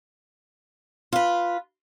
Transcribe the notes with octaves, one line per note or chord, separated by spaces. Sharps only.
F4 B4